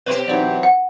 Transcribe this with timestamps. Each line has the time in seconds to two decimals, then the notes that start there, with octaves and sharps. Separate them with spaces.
0.06 B2 G4 B4 C#5 C6
0.28 E3 F#3 C4 D#4 C#5 D5
0.63 F#5